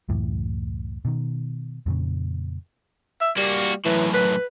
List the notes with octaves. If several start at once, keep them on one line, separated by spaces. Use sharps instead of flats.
C#2 F#2 A2 E3
B2 D#3
F2 A#2 C#3
E5
G3 A#3 F#4
F#2 A2 E3
B4